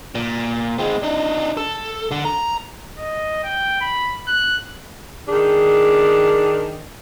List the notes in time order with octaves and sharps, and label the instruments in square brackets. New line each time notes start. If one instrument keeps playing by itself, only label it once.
[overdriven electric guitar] A#2
G#3 C4
D4 D#4
A4
D3
A#5
[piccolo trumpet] D#5
G5
B5
F#6
[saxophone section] D#3 D4 G#4